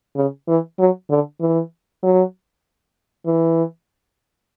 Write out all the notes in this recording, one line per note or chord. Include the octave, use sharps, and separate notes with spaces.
C#3
E3
F#3
D3
E3
F#3
E3